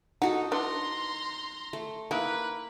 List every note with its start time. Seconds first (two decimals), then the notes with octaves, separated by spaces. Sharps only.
0.22 D#4 F#4 A4 F#5
0.52 D4 E4 B4 A#5 C6
1.73 A3
2.11 A#3 D#4 E4 B4